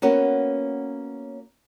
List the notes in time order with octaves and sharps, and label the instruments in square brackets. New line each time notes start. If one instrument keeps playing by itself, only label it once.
[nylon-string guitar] A#3 B3 C#4 F#4